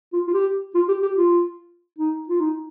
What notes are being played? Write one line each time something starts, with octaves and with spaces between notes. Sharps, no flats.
F4
F4
G4
F4
G4
G4
F4
D#4
F4
D#4